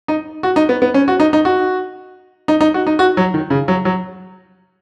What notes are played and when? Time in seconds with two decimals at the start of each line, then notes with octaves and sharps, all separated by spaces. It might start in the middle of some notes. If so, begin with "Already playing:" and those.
0.08 D#4
0.43 F#4
0.56 D#4
0.69 B3
0.82 B3
0.94 C#4
1.08 F#4
1.20 D#4
1.33 D#4
1.45 F#4
2.48 D#4
2.61 D#4
2.74 F#4
2.87 D#4
2.99 F#4
3.17 F#3
3.34 D#3
3.50 C#3
3.68 F#3
3.85 F#3